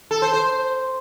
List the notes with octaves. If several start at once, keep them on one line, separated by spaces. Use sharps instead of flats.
A4
C5
C5